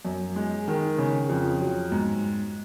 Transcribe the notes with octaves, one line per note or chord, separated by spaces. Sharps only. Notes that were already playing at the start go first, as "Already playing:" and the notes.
F#2
G#3
D#3
C#3
F2
F#3
G#2